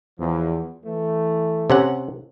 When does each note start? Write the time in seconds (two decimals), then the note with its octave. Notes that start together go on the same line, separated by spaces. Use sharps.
0.19 E2 F3
0.84 E3 A3
1.70 C3 C#4 F#5